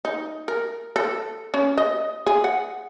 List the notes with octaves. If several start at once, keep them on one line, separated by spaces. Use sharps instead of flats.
D#4
A#4
A4
C#4
D#5
G#4
F#5